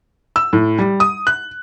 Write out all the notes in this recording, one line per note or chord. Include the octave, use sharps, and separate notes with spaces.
E6
A2
G3
D#6
F#6